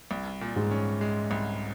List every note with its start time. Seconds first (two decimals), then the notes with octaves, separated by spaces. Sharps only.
0.11 C2
0.41 A#2
0.56 G#2
0.71 C#4
1.01 G#3
1.31 C2